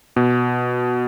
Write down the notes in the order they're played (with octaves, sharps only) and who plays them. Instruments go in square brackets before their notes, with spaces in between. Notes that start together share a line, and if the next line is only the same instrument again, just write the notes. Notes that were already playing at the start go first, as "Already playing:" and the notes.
[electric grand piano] B2